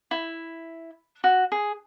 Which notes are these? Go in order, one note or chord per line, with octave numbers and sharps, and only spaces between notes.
E4
F#4
G#4